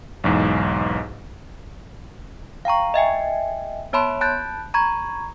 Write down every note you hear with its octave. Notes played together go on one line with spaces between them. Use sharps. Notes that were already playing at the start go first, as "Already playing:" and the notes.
B1 E2 G#2
F5 G5 A#5 C#6
D#5 E5 G5 G#5
B3 C#5 A5 B5 C6
A5 B5 F#6 G6 A6
A#5 B5 C#6 G#6